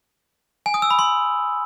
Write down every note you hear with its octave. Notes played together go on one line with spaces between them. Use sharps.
G#5
D#6
E6
B5
C6